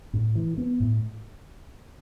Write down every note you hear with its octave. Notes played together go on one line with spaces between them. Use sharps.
A2
E3
B3
A2